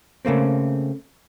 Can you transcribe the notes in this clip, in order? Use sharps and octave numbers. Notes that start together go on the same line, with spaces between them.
C#3 A3 A#3 C4